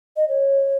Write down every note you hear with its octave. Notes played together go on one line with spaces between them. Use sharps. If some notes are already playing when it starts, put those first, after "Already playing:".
D#5
C#5